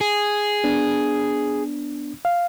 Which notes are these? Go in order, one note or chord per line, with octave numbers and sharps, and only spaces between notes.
G#4
B3 D4
F5